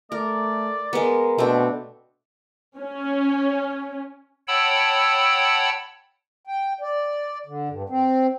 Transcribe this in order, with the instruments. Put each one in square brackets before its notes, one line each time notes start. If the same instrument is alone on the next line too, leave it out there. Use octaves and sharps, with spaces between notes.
[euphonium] A3 [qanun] A#4 [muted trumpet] D5
[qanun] G#3 B3 [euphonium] A#4
[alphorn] B2 [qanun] A3 D4 [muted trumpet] C4
[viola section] C#4
[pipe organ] C#5 F#5 G5 A5 B5 E6
[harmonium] G5
D5
D3
G2
C4